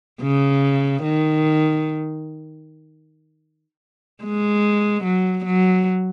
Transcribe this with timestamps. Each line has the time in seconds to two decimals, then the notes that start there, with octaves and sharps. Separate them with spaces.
0.21 C#3
1.03 D#3
4.23 G#3
5.04 F#3
5.45 F#3